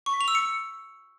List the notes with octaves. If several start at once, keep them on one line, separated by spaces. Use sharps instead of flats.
C#6
B6
F7
E6
C#7